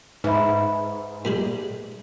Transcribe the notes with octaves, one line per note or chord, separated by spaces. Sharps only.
G#2 B4 E5 B5
A#2 G3 G#3